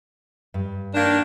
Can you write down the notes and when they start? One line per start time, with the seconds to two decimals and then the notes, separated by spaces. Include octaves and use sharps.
0.54 G2
0.94 D#3 A#3 D4